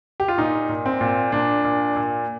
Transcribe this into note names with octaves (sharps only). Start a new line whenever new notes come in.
G4
F4
A#2 D#4
A#2
C4
A#2
A#2 D4
A#2
A#2